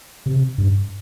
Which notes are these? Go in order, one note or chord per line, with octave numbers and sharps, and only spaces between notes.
C3
G2